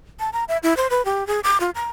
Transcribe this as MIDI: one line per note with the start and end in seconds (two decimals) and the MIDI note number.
0.20 0.30 81
0.33 0.44 82
0.49 0.58 76
0.63 0.76 64
0.77 0.87 72
0.90 1.04 71
1.05 1.26 67
1.27 1.40 68
1.44 1.58 86
1.60 1.70 65
1.75 1.90 82